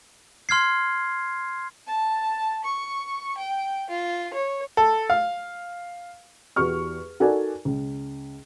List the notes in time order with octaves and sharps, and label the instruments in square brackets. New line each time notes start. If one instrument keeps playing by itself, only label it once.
[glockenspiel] C6 F6 G#6 C7
[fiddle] A5
C#6
G5
F4
C#5
[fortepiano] A4
F5
[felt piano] E2 F#4 G4 C#6 F6
D#4 F#4 A4 A#4 D5 G#5
C#2